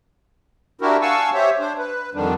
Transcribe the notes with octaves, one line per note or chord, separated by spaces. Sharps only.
D4 E4 F#4 G4 A#4
F5 F#5 G#5 A5 C#6 E6
G4 C5 C#5 E5
D4 C5
B4
F2 D3 D#3 G3 D4